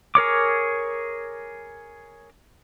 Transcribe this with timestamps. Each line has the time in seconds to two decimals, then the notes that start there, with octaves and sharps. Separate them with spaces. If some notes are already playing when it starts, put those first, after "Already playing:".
0.15 G#4 A#4 C#5 D6